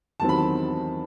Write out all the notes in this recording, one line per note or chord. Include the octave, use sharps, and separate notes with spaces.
E2 D#3 F#3 C4 A5
B5
A5